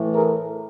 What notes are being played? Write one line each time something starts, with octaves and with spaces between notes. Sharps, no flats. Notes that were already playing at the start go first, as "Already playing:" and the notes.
Already playing: A2 E3 A3
G#4 A#4